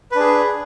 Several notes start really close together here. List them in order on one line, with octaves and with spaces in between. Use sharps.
B4 D4 G#4